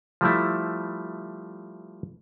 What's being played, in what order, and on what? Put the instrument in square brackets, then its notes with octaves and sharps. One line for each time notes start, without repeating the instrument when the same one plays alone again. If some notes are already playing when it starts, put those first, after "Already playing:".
[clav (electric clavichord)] F3 G3 A3 E4